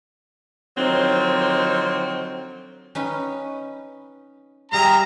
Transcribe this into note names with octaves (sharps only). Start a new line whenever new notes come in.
D3 D#3 F3 F#3 C4 D#4
C#4 D#4 B4
G3 G#4 E5 F5 A#5 C6